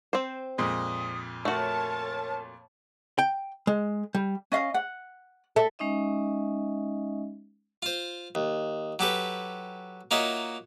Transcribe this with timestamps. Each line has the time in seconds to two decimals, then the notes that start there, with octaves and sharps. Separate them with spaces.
0.13 C4 C5
0.58 F2 A#2 G#3 D#6
1.45 A3 F#4 A#4 C#5 A5
3.19 G5
3.67 G#3
4.15 G3
4.52 C#4 D#5 F5
4.74 F#5
5.56 A4 E5
5.79 G#3 C#4 D#4 D#5 E5
7.83 F4 C5
8.35 D#2
8.99 F#3 G4 A4 B4
10.11 A#3 D#4 F4 F#4 C#5 E5